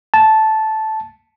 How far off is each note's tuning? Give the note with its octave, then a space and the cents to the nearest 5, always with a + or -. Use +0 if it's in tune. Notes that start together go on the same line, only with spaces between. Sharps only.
A5 -10